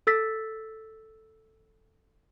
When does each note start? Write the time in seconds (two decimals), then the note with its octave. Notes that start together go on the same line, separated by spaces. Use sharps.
0.07 A4 E6 A6 B6